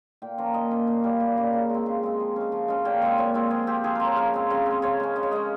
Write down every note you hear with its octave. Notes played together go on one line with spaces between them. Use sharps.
A#2 G5
F3 A#3 C#4 A#5
A#2 D#5
F3 A#3 C#4
A#2 F5
G3 A#3 C#4
A#2
G3 A#3 C#4
C#3
G#3 C4
C#3
G#3 C4
F3
G#3 C#4
F3
G#3 C#4
A#2 G5
G#3 C4 G#5
A#2 C#5
G#3 C4 F4
F3 G#4
C4 G4
F3 G#4
C4 A#4
C#5
C#3 A#4
G#3 C4
C#3
G#3 C4
C#3 C#5
G#3 C#4
C#3 D#5
C#5
G#3 C#4 D#5